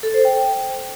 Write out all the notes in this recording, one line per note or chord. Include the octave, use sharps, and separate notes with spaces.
A4
C5
G5